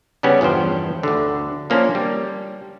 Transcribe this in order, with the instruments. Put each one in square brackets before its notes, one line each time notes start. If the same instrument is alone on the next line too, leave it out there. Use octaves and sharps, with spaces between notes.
[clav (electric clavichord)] C#3 G3 B3 C#4
E2 G2 F3 C5 G5
D2 D3
F3 A#3 C#4 D4 C5
G3